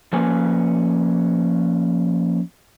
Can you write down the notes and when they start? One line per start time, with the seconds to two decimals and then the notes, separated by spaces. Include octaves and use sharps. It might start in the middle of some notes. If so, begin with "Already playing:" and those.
0.13 F3 A#3 C#4 B4 G#5